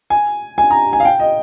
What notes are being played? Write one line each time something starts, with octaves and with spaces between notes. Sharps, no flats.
G#5
G#5
A#5
G#5
F5
G5
D#5